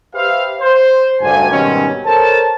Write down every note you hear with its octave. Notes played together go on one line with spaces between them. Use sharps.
G4 B4 C5 E5 F5
C5
F#1 D2 G2 G#5
G#2 B2 D#3 G3 C4 C#4
A4 A#4 C5 C#5 A5